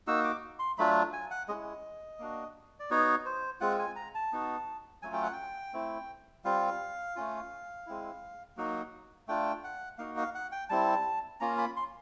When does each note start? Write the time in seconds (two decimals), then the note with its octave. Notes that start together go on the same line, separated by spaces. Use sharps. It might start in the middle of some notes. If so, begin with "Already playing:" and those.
0.07 A#3 D#4 F#4 E6
0.24 D6
0.59 C6
0.78 F#3 A3 D4 F4 B5
1.13 G#5
1.31 F#5
1.48 G#3 C#4 E4 D#5
2.19 A#3 D4 F#4
2.80 D5
2.90 B3 D#4 F#4 C#5
3.26 C5
3.60 G#3 C4 F4 F#5
3.79 G#5
3.96 A#5
4.15 A5
4.33 B3 D#4 F#4
5.02 F#3 A3 C#4 F4 G#5
5.13 G5
5.23 F#5
5.33 G5
5.74 A3 C4 E4
6.44 G3 C4 F4 F5
7.16 A3 C#4 F4
7.87 G#3 C4 E4
8.57 F#3 A#3 D#4 F#4
9.28 A3 D4 F4 G5
9.64 F#5
9.98 A#3 D#4 F#4 F5
10.17 F5
10.35 F#5
10.52 G5
10.69 G3 C4 E4 A5
11.40 A#3 C#4 F4 A#5
11.58 B5
11.76 C6